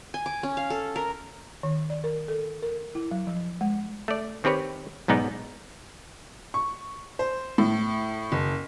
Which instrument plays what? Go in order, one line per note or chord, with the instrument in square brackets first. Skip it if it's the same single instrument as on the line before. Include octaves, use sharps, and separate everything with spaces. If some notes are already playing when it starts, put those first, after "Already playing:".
[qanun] G#5
D6
C#4
F5
A4
A#4
[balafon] D#3
D5
A#4
A4
A#4
E4
F#3
F3
G#3
[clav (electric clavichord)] A3 D5
D#3 C4 G4 B4 C#5
B1 G#2 B3 D#4 D5
[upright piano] C#6
C5
A2
F#1